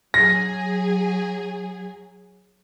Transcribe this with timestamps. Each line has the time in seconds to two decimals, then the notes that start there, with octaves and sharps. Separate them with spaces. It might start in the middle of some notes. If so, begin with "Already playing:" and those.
0.14 F#3 G#4 A#6